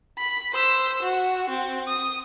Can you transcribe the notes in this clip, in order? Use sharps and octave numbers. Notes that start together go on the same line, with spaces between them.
B5
C5 E6
F#4
C4
D#6